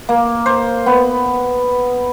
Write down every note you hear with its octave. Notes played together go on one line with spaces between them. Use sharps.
A#3
C5
B3